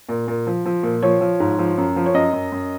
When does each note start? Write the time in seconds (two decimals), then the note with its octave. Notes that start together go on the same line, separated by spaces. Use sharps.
0.09 A#2
0.28 A#2
0.47 F3
0.66 F3
0.83 A#2
1.02 F3 C#5
1.21 F3
1.40 G#2
1.59 F3
1.78 F#2
1.96 F3
2.06 C#5
2.14 F#2 D#5
2.33 F#2
2.52 F#2